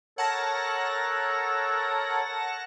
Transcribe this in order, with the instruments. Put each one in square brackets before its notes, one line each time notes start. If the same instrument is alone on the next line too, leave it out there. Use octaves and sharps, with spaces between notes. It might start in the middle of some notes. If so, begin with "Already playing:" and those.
[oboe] A4 [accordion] A#4 C#5 [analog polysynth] F#5 A5 A#6